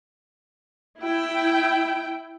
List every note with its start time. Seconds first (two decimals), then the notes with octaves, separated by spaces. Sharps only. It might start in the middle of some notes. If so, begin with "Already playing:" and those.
1.00 E4 G5